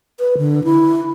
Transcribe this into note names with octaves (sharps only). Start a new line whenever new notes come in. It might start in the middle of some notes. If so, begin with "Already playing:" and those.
B4
D3
E4